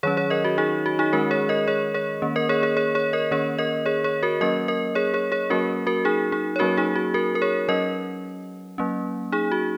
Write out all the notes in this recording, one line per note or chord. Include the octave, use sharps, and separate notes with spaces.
D#3 F#3 C#4 G#4 C#5
G#4 C#5
A#4 D#5
F#4
D#4 G#4
F#4
D#4 G#4
D#3 G#3 C#4 F#4 A#4
G#4 C#5
A#4 D#5
G#4 C#5
G#4 C#5
D#3 A#3 C#4
A#4 D#5
G#4 C#5
G#4 C#5
G#4 C#5
G#4 C#5
A#4 D#5
D#3 A#3 C#4 G#4 C#5
A#4 D#5
G#4 C#5
G#4 C#5
F#4 A#4
F#3 A#3 C#4 A#4 D#5
A#4 D#5
G#4 C#5
G#4 C#5
G#4 C#5
F#3 A#3 C#4 F#4 A#4
F#4 A#4
D#4 G#4
D#4 G#4
C#5
F#3 A#3 C#4 F#4 A#4
D#4 G#4
F#4
F#4 A#4
A#4
G#4 C#5
F#3 C#4 A#4 D#5
F#3 A#3 C#4
D#4 G#4
F#4